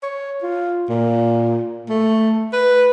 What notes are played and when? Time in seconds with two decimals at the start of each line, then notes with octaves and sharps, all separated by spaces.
0.03 C#5
0.43 F4
0.89 A#2
1.89 A3
2.53 B4